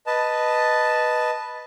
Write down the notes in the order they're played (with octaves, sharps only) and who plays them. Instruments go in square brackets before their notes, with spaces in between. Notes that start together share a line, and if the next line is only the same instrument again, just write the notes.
[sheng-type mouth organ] B4 D#5 A5